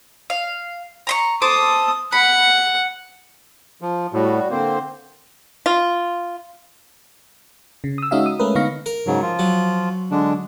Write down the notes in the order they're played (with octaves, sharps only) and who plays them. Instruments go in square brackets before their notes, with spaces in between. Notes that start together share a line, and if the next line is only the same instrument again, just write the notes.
[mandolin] F5
A#5 C6 C#6
[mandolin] A4 C5 D6 [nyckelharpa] D#6
[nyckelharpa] F#5 [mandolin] B5
[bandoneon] F3
[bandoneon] A2 [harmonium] G3 F#4
[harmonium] D3 C4 C5 [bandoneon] A#3
[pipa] F4
[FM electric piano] C#3
D#6 E6
G#3 C#4 D#4 F#4 E5 F5
D#6
G#3 A3 C#4 A#4 B4
D3 B3 D#4 F5 C#6 A#6
[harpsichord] A#4
[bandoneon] G#2 C#3 F#3
F3 F4
[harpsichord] F#3
[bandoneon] D3 G#3 D4